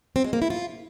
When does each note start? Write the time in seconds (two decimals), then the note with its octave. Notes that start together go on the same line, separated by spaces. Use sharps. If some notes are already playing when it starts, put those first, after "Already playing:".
0.16 C4
0.24 G#3
0.33 A#3
0.42 E4
0.50 F4